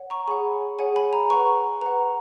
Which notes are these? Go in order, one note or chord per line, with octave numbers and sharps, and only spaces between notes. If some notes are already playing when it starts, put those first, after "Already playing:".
Already playing: C#5 F#5
A#5 C#6
G#4 C#5 F#5 G#5 B5
G#4 C#5 F#5 G#5
G#5 B5
A#5
B4 F#5 A#5 C#6
B4 F#5 A#5